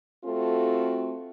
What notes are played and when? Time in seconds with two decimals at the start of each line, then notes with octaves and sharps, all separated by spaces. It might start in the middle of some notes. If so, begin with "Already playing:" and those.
0.25 A3 C4 F4 F#4 A4